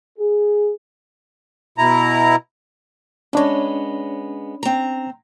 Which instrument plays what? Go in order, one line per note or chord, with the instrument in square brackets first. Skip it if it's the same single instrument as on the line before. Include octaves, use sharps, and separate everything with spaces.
[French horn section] G#4
[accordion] B2 E4 A#5
[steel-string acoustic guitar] G#3 B3 [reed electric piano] C#4 D4 C#5
[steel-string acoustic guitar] C4 A#5